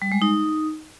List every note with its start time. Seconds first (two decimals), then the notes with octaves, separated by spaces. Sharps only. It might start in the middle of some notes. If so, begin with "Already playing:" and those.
0.02 G3
0.12 G#3
0.22 D#4